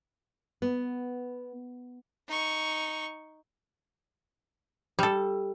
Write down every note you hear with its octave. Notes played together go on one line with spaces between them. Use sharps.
B3
D#4 C#6
G3 A4